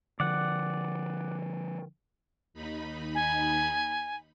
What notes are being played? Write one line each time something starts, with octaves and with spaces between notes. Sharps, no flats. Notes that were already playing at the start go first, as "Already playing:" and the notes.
D3 F3 D5 F#5
D#2 D#4 B5
G#5